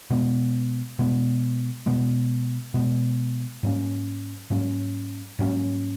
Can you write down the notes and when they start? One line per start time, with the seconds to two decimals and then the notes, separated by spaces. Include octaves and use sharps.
0.10 B2 G#3 B3
0.99 B2 G#3 B3
1.86 B2 G#3 B3
2.74 B2 G#3 B3
3.63 G#2 F#3 A#3 C#4
4.50 G#2 F#3 A#3 C#4
5.39 G#2 F#3 A#3 C#4